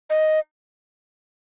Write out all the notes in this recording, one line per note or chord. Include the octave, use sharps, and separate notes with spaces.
D#5